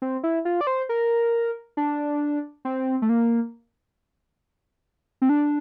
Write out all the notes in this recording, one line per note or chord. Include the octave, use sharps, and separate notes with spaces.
C4
E4
F4
D5
C5
A#4
D4
C4
A3
A#3
C4
D4